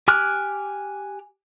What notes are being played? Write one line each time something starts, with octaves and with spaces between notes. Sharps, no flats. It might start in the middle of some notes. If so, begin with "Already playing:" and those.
G4 G#5 D6 F6 F#6